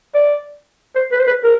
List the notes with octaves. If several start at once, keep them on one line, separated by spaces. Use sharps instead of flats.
D5
C5
B4
C5
B4
A#4